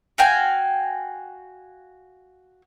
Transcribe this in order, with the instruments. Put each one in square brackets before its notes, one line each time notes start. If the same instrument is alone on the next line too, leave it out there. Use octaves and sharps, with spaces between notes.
[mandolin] F#4 F5 G5 G#5